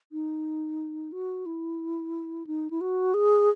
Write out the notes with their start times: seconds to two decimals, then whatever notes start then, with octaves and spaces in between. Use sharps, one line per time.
0.12 D#4
1.12 F#4
1.46 E4
2.47 D#4
2.71 E4
2.81 F#4
3.14 G#4